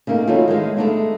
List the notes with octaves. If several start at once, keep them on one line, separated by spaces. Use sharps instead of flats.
C#3 A3 A#3 D#4
E3 F#3 A3 B3 D#4 F4
D#3 E3 G#3 F5
G#3 A3 B3 C4 D4 D#4